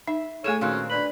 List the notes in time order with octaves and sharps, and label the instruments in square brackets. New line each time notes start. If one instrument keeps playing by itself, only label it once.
[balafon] D#4 [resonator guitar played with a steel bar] E5
[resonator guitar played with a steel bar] A2 G#5 [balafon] A3 G#4 A4 [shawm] C#5
[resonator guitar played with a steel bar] A#2 D#3 C4 [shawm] C#4 [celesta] F#4 F5 F#6
[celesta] D4 D5 F#7 [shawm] B4